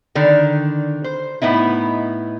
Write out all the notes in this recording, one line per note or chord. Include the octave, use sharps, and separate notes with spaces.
D3 D#3 D4
C5
A2 B3 D#4 E4